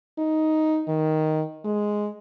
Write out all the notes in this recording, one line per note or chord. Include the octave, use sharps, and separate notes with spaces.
D#4
D#3
G#3